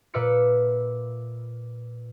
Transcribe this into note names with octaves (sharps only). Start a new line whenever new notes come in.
A#2 B4 E5 D6 F6 C#7